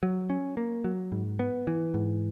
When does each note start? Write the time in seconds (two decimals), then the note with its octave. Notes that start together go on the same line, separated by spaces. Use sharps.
0.03 F#3
0.30 C#4
0.57 A#3
0.84 F#3
1.12 G#2
1.39 B3
1.67 E3
1.94 G#2